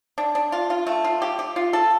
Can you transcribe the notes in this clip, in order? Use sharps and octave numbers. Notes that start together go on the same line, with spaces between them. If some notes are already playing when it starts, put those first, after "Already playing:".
D4
D4
F4
F4
A3
F4
G4
G4
F4
A4